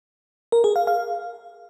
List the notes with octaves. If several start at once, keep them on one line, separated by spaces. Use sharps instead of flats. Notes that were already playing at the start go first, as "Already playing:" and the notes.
A#4
G#4
F5
F5